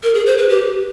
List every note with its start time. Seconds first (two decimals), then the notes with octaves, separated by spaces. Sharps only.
0.03 A#4
0.15 G#4
0.26 C5
0.37 B4
0.49 G4